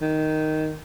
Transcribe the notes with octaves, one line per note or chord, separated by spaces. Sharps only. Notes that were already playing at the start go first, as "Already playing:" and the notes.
D#3